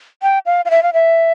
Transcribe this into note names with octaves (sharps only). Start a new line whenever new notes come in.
G5
F5
F5
E5
F5
E5